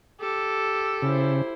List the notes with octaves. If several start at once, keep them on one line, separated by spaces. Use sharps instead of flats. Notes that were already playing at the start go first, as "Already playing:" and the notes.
G4 A4
C#3 E4 C5